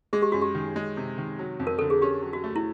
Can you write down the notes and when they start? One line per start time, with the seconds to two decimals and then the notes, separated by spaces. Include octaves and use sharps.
0.13 G#3 G#4
0.22 G4
0.32 F#2 F#4
0.42 G4
0.55 D#3
0.76 G#3
0.97 C3
1.18 D#3
1.39 F#3
1.60 F2
1.67 A#4
1.79 D3 A4
1.90 G#4
2.02 C#4 G4
2.22 F#3
2.33 F#4
2.44 A3
2.56 E4